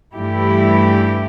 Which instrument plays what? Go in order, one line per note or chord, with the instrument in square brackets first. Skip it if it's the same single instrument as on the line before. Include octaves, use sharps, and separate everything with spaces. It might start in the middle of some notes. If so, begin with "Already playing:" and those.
[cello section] G2 E3 A3 E4 G4